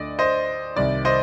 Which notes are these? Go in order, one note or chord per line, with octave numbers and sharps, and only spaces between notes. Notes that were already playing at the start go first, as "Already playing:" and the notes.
Already playing: D2 D3 D5 D#5
C5 D#5
C2 C3 D#3 D5
C5 D#5